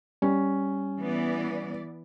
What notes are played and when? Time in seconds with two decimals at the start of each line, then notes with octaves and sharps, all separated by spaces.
0.22 G3 C#4
1.00 E3 B3 D5